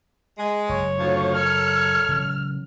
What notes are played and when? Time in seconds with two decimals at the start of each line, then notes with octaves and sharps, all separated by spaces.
0.38 G#3
0.69 F#1 C#5
0.98 D2 A2 F3
1.35 A4 A#4 C#5 F6
2.09 C#3 E3 F#3